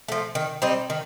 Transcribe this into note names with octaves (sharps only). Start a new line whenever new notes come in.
F3 A3
D#3
G3 C4 D#4
D#3